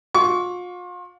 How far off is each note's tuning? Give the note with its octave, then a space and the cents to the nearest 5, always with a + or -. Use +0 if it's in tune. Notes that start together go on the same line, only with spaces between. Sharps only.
F4 +40 C#6 +40